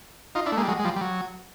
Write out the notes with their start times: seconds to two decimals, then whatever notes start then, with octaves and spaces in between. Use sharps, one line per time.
0.35 D#4 F4
0.46 D4 E4
0.52 A3
0.57 G#3 A#3
0.63 G3
0.68 F#3 G#3
0.79 G#3
0.84 F3 G3
0.96 G3
1.01 F#3